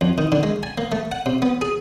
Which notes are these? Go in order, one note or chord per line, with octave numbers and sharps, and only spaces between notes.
F2
D#3
D3
G#3
G#5
A#3
A3
F#5
C3
B3
G#4